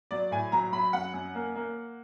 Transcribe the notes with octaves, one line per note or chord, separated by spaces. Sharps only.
F#3 D5
A2 G#5
F#3 A#5
F#3 B5
F#2 F#5
F#2
A#3
A#3